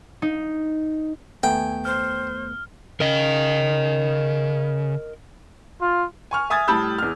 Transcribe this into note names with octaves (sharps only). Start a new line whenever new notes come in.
D#4
D#2 A3 B3 G5 G#5
C5 F6
C#3 A#4 D#5
F4
G#5 C#6 F6
E5 G#5 D#6 G#6 A6
A2 G3 A5 B5 E6 G6
E2 F6